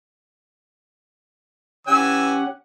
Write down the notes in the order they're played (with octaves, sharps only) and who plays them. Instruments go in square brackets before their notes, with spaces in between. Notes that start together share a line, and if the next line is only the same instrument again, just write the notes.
[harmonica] E3 G#5 E6 [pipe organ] C#4 G4 F#5